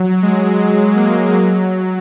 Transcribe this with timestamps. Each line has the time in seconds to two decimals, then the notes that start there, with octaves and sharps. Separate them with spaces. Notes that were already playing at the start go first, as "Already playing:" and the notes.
Already playing: F#3
0.23 G#3
0.58 G#3
0.96 F#3 A#3
1.32 F#3